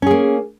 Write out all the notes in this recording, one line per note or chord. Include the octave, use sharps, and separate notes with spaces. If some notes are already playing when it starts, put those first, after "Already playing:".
A#3 C#4 G#4